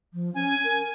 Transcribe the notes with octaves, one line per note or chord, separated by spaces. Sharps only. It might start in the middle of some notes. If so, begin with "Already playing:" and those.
F3
C#4 G#5
A#4